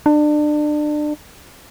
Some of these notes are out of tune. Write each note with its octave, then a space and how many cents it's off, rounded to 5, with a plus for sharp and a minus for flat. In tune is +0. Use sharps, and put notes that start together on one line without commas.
D4 +30